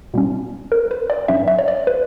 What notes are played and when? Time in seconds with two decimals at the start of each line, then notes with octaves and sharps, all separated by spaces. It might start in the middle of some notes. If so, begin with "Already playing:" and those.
0.14 B2 G3 C#4
0.72 A#4
0.91 B4
1.10 D5
1.28 G2 F#3 C#4 E5
1.48 E5
1.59 C#5
1.68 D5
1.87 B4